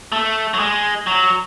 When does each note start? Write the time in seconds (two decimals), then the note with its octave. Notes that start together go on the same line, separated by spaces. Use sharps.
0.12 A3
0.54 F#3
0.60 G#3
1.07 F#3